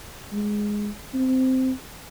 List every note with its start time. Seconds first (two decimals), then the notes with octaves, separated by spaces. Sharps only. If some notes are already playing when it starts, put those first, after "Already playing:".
0.32 G#3
1.14 C4